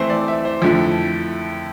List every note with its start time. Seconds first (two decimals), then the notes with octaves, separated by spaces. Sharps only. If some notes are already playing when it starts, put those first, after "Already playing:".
Already playing: E3 A3 C4 C5
0.10 D5
0.28 E5
0.45 C5
0.62 F2 D3 A3 E4